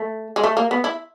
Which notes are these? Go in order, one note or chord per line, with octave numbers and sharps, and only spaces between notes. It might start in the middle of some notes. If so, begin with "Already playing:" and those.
Already playing: A3
G#3
A3
A#3
B3
E4